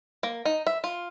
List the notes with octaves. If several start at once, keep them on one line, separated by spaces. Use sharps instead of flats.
A#3
D#4
E5
F4